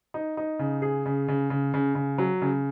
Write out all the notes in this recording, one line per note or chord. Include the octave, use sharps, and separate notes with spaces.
D#4
D#4
C#3
G#4
C#3
C#3
C#3
C#3
C#3
F#3
C#3